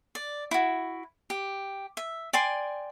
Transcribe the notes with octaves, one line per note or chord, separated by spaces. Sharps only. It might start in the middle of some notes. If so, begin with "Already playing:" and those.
D5
E4 F#4
G4
E5
D5 G5 G#5 C6